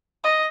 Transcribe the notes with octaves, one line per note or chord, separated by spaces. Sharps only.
D#5